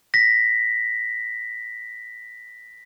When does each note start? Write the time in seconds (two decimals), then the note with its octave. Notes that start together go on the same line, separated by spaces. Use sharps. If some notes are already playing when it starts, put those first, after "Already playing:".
0.14 A#6 B6